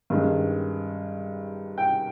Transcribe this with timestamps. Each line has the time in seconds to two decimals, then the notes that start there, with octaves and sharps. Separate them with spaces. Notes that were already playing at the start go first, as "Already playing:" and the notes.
0.10 G2 D#3 G#3 C#4
1.78 G5